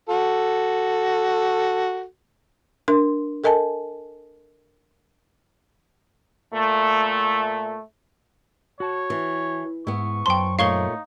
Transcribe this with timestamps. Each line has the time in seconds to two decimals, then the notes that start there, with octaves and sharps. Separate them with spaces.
0.09 F#4 A4
2.88 D4 A#4 C6
3.44 A4 A#4 D#5 G#5 A5
6.53 A#2 A3
8.80 F#4 C#5 A5
9.10 E3
9.87 G#2 B3 E4 C#6
10.26 F#2 C5 G5 A5 C6
10.59 A#2 A3 D#4 C#5 F5 C#6 G7